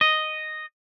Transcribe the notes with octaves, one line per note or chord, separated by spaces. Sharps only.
D#5